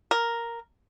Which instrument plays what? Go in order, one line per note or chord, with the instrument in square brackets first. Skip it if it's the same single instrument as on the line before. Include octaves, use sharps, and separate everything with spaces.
[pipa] A#4